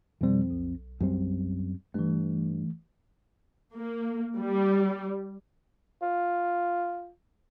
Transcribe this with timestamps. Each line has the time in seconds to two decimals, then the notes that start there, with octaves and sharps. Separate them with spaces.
0.21 F2 B2 G3 C4
0.50 B1
1.00 F#2 G3 C4
1.94 G2 E3 A3
3.74 A#3
4.38 G3
6.02 F4